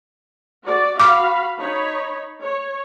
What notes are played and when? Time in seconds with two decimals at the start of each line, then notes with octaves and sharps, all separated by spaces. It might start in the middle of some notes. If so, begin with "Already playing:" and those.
0.65 F#4 D5
1.00 F#4 F5 B5 D6
1.59 D#4 C#5 B5
2.44 C#5